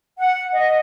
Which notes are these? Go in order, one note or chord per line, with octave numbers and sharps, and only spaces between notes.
F#5
D#5